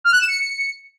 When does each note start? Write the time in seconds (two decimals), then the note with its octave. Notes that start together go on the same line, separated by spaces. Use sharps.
0.04 F6
0.12 F#6
0.20 E7
0.27 C#7